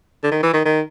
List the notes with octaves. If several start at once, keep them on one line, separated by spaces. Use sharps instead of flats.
D3
D#3
E3
D#3
D#3